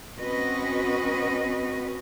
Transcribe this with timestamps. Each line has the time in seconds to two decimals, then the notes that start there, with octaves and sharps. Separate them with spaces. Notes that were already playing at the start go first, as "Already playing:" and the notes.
0.20 C4 C#4 F#4 B4 D#5